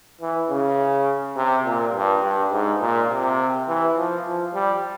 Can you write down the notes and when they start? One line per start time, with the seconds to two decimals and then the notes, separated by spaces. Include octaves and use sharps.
0.22 E3
0.50 C#3
1.37 C3
1.66 A#2
1.94 G2
2.24 G2
2.52 G#2
2.81 A#2
3.10 C3
3.68 E3
3.98 F3
4.25 F3
4.54 G3